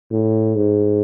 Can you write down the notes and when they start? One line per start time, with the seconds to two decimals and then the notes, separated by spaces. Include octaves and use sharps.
0.11 A2
0.56 G#2